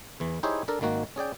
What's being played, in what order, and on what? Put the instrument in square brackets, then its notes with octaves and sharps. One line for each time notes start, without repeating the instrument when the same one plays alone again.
[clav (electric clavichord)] E2 E3
D#4 E4 G4 G#4 C5 C#5
D4 A4 A#4 D5
G#1 D#3 A#3 F#4
C#4 G#4 D5 G5